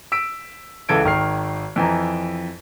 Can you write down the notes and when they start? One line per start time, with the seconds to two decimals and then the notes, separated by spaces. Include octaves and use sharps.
0.12 E6 B6 D7
0.89 C#2 E3 A4 G#6 D7
1.04 G#1 D#3 F6 C7
1.76 F2 E3 G#5 A#5